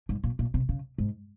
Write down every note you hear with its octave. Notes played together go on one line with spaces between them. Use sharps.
G#2
A#2
A#2
C3
C#3
G#2